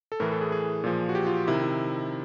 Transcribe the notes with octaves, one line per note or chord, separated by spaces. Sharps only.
A4
A2 E3 A#4
A4
G#4
G#4
A#2 F3
F#4
G4
F4
C3 D#3 E4
E4